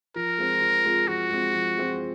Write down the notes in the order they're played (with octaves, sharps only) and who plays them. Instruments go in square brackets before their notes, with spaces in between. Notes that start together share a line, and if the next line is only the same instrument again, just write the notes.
[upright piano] F3 [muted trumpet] A#4
[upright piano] G#3 C4 F4
F3
G#3 C4 F4
[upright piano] F3 [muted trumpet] F#4
[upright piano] G#3 C4 F4
F3
G#3 C4 F4